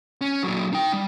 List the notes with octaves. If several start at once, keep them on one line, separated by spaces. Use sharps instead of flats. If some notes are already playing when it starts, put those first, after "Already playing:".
C#4
A#2 F#3
D#4 G5
G3